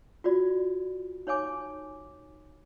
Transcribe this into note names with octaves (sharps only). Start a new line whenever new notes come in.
F4 F#4 D5
D#4 C#5 F5 G#5 D6